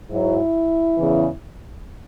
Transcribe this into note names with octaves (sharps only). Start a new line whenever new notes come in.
G#2 F#3 E4
E2 C#3 E3